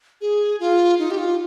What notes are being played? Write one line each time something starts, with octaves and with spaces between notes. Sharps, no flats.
G#4
F4
D#4
G4
F4